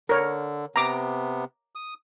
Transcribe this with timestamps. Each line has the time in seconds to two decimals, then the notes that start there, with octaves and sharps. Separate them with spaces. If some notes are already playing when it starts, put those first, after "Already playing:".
0.09 D3 A#4 C#5
0.76 C3 B3 A#5 D6
1.75 D#6